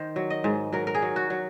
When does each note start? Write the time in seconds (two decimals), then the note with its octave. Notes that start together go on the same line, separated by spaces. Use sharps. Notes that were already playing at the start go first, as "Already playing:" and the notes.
Already playing: D#3 C5
0.16 F#3
0.30 D#5
0.44 G#2
0.72 F#3 A#4
0.87 A#4
0.95 G#4
1.02 F#3
1.16 F#4
1.30 F#3